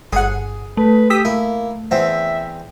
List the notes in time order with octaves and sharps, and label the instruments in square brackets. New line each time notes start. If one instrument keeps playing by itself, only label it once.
[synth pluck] G1 F#5 [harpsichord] G#4
[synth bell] A3 [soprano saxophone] B4
[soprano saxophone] G4 [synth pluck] D#6 E6 B6
[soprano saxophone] A#3 [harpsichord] E4
[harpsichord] E2 C4 [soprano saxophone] E5